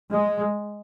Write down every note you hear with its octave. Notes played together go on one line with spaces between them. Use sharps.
G#3